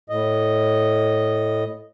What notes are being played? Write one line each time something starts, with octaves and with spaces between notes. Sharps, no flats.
A2 D#5